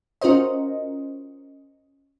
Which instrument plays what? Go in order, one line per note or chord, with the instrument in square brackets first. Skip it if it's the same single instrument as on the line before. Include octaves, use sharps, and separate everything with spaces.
[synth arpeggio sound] C#4 F4 F#4 A#4 C5 D#5